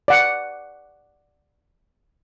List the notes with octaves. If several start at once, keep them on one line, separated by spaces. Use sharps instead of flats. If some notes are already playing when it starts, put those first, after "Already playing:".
D5 F#5